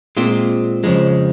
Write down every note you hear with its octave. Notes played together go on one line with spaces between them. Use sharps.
A#2 G#3 C4 F4
F2 C#3 F3 G#3